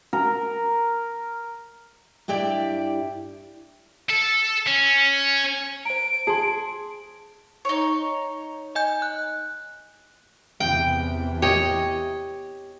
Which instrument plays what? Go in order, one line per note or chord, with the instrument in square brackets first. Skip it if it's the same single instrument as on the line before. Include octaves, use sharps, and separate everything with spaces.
[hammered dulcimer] A#4
[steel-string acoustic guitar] G2 E4 G4 D5
[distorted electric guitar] A4
C#4
[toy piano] C5 A#5 [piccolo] D7
[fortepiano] G#4 [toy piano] A5 C6
[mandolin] D#4 C#5
[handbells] D#5 G#5 G6
F#6
[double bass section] E2 C3 E3 [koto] G5
[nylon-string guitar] G4 [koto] C#5 D#5